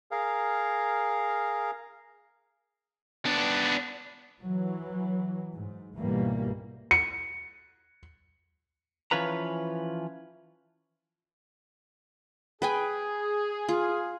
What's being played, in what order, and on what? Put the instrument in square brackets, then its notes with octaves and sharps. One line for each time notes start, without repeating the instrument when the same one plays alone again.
[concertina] G#4 A#4 F5
[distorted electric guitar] B3 D4
[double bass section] E3 F#3
G#2
C#2 G#2 B2 E3 G3 A#3
[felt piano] C#7
[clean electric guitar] E3 F3 C#4 F4 B4 A#5
[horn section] G#4 [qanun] B4 G5 G#5
[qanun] F4